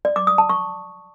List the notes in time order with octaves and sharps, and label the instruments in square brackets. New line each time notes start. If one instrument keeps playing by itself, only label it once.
[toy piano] D5
D6
D#6
A5
C#6